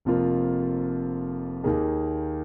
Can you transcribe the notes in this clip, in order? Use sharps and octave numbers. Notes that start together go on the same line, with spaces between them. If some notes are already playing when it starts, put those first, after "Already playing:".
F1 F2 F3 A#3 F4
D#2 D#3 A#3 G#4